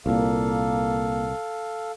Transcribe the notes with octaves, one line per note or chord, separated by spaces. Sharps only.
C2 A#2 A#3 A4 F5